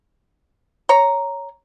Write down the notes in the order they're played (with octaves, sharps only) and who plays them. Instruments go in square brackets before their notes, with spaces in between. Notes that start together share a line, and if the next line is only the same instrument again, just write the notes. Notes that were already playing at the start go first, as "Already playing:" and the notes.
[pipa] C#5 A#5